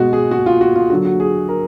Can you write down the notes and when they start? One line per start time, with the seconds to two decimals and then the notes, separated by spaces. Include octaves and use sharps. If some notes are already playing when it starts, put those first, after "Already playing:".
Already playing: B2 G#3 F#4
0.13 G#4
0.31 F#4
0.46 F4
0.61 F#4
0.76 F4
0.90 D3 F#3 F#4
1.05 F#4
1.20 G#4
1.49 A#4